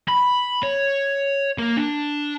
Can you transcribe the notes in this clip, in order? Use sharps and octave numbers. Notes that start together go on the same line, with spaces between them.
B5
C#5
A#3 A#4
D4